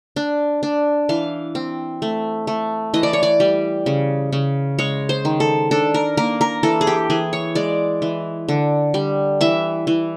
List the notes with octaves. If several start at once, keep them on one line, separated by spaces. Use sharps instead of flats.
D4
D4
E3 F5
C4
A3
A3
E3 D#5
D5
C#5
D5
G3
C#3
C#3
G#3 C#5
C5
D#3
A4
D4 A4
A#4
A#3 A#4
A#4
E3 A4
G#4
G4
E3 G#4
C#5
G#3 D5
E3
D3
G3
E3 E5
E3